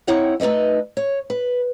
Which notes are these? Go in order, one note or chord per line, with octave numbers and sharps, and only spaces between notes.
C4 D#4 E4 C#5 F#5 G5
A3 D#4 B4 D#5 E5
C#5
B4